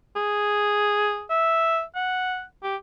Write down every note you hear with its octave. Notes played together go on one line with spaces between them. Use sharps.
G#4
E5
F#5
G4